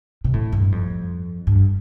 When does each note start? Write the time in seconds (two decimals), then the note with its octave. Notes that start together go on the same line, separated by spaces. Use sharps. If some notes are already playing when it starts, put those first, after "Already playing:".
0.24 C3
0.34 A2
0.52 G2
0.72 F2
1.47 G2